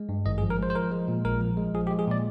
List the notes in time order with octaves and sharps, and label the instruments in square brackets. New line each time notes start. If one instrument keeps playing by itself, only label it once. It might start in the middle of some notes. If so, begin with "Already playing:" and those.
Already playing: [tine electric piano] G#3
G2
G#1 D#5
G#4
F3
A#4
G#3 C5
C5
F3 A#4
G#3
A#2
A#1 A#4
F3
G#3
F3 G#4
G4
G#3
G#4
A#2 D5